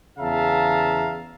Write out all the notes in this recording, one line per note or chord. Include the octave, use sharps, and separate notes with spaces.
E2 C#3 E5 F5 A5 A#5